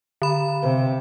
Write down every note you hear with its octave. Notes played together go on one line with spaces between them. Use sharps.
D3 B5
C3